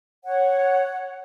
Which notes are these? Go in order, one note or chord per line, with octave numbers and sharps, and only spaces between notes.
C#5 F#5